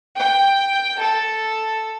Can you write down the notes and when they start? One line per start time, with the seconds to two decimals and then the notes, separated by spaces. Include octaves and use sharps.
0.18 G5
0.99 A4